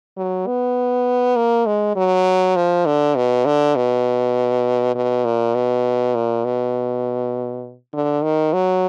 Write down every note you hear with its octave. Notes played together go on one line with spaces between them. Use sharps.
F#3
B3
A#3
G#3
F#3
F3
D3
B2
D3
B2
B2
A#2
B2
A#2
B2
D3
D#3
F#3